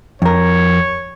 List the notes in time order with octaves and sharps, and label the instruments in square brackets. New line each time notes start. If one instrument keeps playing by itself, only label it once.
[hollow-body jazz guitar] F2 A#4 [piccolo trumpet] C#5